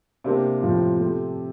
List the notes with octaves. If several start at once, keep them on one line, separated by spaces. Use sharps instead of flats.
C3 A#3 D4 G4 C5 F5
A2 F3 C4 F4 C5
A3 C4 G4